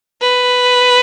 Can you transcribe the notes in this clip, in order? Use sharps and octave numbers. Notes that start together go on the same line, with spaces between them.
B4